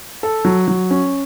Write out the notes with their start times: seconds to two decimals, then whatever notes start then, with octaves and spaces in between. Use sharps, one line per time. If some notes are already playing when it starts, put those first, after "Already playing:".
0.23 A4
0.45 F#3
0.68 F#3
0.91 C#4